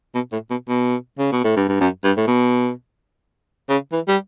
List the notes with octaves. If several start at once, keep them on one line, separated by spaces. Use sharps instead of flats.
B2
A2
B2
B2
C#3
B2
A2
G2
G2
F#2
G2
A2
B2
C#3
E3
G3